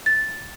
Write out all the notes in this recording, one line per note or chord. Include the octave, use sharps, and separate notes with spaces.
A6